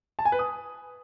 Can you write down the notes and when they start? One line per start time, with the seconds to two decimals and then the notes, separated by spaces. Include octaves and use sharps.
0.19 A5
0.25 G#5
0.32 B4
0.39 D#6